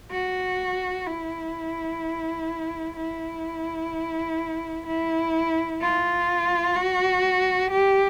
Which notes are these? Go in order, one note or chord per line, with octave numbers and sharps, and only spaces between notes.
F#4
E4
E4
E4
F4
F#4
G4